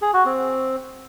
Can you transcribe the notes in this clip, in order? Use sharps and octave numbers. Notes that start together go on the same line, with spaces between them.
G#4
F#4
C4